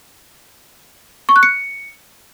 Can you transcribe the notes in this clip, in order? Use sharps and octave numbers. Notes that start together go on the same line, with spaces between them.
C#6
F#6
C#7